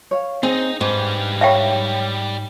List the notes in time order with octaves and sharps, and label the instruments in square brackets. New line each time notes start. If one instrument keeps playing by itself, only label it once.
[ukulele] C#5 F5
[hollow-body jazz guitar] C4 [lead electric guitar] D#4 [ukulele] G#4
[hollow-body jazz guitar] G#2 [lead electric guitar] G3 B4
[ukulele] D#4 C#5 B5 [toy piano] E5 F5 G5